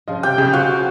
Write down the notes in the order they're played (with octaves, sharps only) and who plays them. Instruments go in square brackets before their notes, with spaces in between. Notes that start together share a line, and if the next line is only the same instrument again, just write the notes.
[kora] C#3 F3 F4 [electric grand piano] D#5
[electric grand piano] C3 [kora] G4 [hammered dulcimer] G5
[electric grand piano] B1 C#3 [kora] G#4
[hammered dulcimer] F#4 [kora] C5 F#5 [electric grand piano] F5